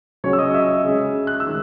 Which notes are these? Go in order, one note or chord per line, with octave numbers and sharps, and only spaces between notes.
C#3 F#3 C#4 C#5 C#6
E6
D#5 D#6
E5 E6
C#3 G#3 C#4
F#6
E6
D#3 G#3